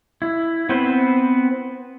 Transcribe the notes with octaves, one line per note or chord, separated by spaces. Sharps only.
E4
B3 C4 B4 C5